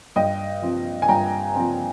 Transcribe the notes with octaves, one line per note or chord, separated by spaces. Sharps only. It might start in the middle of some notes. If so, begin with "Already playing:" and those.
G2 D#5 G5
F3 C4
G#5
G2 G5 A#5
F3 C4